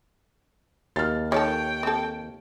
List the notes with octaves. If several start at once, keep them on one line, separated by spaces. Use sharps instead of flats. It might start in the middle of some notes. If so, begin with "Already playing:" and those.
D#2 F6 A6
D#3 G4 A4 C#5 G5
C4 A4